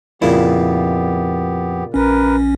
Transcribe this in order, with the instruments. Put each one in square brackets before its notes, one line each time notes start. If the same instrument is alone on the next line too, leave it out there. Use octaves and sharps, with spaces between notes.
[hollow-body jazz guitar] F2 E4 [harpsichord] A#2 C#3 [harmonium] B3 G4
[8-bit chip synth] A#1 C#4 [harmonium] A#4 B4